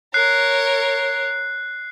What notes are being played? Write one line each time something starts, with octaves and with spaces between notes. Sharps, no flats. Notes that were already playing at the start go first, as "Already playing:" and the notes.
A#4 C#5 F#6 C7